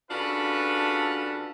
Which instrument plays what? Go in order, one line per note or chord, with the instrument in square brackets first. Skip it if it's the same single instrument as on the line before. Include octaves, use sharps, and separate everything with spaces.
[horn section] C#3 D4 F4 F#4 A4 B4